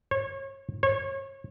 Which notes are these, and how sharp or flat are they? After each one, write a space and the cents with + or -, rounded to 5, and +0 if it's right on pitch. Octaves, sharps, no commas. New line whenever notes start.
C#5 -30
C#5 -30